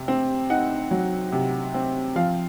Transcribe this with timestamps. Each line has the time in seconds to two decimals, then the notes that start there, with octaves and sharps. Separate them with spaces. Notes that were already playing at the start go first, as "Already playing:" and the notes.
Already playing: C3
0.08 C4
0.50 D#4 F#5
0.91 F#3
1.32 C3
1.74 C4
2.16 F3 F5